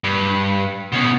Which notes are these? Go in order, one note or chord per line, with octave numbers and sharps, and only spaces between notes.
G2
B2 C#4